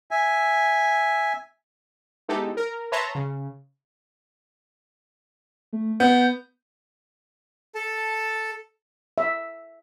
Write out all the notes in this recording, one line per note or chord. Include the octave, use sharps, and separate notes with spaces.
E5 G#5
G#3 B3 D#4 E4 G4 A4
A#4
B4 C#5 E5 A5 A#5 C6
C#3
A3
B3 G6
A4 A5
E5